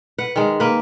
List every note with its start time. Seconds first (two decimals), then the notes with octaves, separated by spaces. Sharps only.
0.18 B4 F#5
0.36 D#3 G#3
0.60 A#3 B4